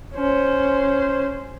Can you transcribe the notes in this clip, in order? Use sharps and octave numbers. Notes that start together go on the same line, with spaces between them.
C#4 C5